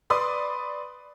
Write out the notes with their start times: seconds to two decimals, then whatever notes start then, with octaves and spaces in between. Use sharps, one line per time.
0.10 B4 D5 C6 D#6